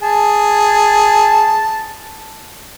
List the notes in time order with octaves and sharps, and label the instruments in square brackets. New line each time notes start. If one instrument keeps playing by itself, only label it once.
[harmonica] G#4 A5